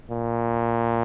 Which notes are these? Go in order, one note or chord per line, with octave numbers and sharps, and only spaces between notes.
A#2